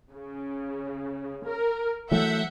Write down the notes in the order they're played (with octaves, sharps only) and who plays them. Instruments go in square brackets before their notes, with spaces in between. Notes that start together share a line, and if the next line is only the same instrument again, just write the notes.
[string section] C#3
A#4
[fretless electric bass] E3 F#3 A3 [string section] E5 F#5 G6